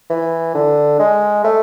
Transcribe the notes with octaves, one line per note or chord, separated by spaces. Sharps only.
E3
D3
G#3
A3